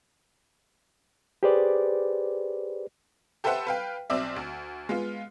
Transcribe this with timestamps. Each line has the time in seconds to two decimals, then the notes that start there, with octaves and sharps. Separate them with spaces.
1.43 G4 G#4 B4 C5 D5
3.44 G4 A4 B4 C5 E5 F#5
3.67 B4 F5 G5
4.10 B1 C4 D5 E5
4.36 D2
4.89 G#3 B3 F4